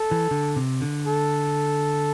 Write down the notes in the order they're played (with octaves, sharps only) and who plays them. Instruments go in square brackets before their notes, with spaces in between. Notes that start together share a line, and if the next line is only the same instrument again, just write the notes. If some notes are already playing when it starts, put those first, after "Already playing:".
Already playing: [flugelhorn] A4
[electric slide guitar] E3
D3
C3
D3
[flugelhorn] A4